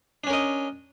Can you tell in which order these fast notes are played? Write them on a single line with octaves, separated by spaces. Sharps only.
D4 C#4 A#4 D#5